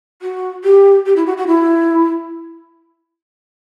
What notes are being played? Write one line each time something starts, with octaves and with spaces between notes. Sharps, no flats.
F#4
G4
G4
E4
F#4
F#4
E4